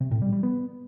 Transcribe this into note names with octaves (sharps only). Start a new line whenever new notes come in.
C3
A2
G3
G3
B3